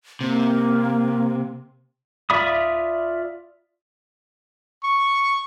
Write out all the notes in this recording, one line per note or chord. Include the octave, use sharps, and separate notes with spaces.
C3 A#3
F4 D5 E5 B5 D#6
C#6